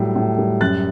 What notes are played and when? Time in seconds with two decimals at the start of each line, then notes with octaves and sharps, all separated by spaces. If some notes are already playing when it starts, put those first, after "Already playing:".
Already playing: A2 F#3 G3
0.16 A2
0.38 G3
0.61 F#2 F#6 A6